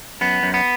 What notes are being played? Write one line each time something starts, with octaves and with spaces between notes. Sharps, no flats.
F#2 B3
F#2
B3